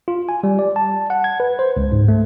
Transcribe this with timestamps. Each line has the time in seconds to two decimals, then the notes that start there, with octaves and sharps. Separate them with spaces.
0.08 F4
0.29 G#5
0.43 G3
0.59 D5
0.76 A5
1.10 F#5
1.24 G#6
1.40 B4
1.59 C5
1.77 C#2
1.92 G#2
2.08 A3